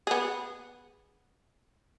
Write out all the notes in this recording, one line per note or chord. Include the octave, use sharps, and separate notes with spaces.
B3 G#4